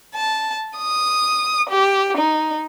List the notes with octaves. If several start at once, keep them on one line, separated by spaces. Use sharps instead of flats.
A5
D#6
G4
D#4